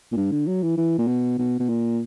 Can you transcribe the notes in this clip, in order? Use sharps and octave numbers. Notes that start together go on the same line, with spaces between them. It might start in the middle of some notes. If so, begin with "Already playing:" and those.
A#2
G2
D3
F#3
E3
E3
A#2
B2
B2
B2
A#2